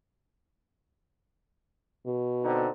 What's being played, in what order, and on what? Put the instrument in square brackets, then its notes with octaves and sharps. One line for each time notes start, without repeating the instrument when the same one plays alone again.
[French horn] B2
[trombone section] D3 C4 D#4